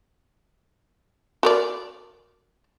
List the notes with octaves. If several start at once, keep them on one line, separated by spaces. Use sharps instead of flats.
F#4 A#4 D5